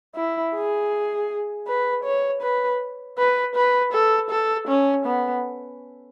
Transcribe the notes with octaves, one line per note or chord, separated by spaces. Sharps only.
E4
G#4
B4
C#5
B4
B4
B4
A4
A4
C#4
B3